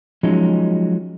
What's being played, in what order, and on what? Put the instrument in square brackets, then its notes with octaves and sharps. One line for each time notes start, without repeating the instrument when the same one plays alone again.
[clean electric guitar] F3 F#3 G#3 C#4 D#4